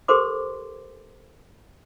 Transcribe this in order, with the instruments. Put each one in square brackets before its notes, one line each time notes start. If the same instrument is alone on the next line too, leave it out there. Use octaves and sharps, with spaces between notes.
[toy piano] G4 A4 A#4 C5 C6 D6